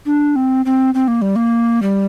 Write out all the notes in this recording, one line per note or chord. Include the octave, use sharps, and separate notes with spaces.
D4
C4
C4
C4
A#3
G3
A#3
G3